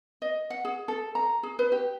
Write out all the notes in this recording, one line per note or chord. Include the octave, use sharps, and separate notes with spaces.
D#5
F#5
G#4
A4
A#5
G#4
B4
G4